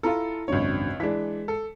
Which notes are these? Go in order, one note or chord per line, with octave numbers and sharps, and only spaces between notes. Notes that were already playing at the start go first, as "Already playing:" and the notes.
E4 F4 A4 A#5
G#1 C#2 F#2 D4 C#5
E3 G#3 D4 B6
A4